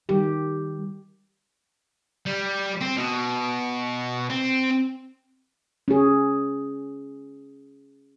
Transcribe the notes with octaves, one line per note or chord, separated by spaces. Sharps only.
D#3 G3 G4
G3
C4
B2
C4
C#4 G#4